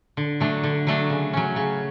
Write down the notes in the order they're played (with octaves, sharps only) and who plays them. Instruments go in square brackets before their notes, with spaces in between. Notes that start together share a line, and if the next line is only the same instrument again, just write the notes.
[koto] D3
F#3 A3 D4
D3
F#3 A3 D4
C#3
F#3 C#4
C#3